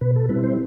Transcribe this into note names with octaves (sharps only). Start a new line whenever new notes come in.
B2 B4
A4
G3 C4 E4 B4
C5